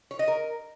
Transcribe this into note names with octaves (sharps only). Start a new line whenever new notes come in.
C#5
D#5
A#4